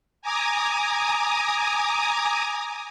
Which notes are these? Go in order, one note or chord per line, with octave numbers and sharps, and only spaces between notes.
G#5 A#5 D6 D#6